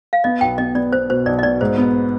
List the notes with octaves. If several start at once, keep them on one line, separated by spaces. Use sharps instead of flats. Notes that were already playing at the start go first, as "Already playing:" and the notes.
F5
B3 D#5
B1 G5
B3 D#5
B3 D5
B3 C5
B2 C5
B1 D5
D#5
B2 D5
G#2 C5
B3